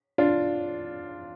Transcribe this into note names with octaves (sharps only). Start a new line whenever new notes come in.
D4 F4